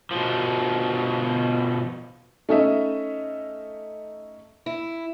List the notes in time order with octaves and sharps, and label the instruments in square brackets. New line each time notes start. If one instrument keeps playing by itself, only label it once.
[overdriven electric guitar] B2 F3
[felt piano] A3 C#4 D#4 D#5 E5
[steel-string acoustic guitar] E4